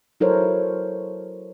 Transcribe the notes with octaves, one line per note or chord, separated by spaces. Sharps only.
F#3 E4 A4 A#4 C5 C#5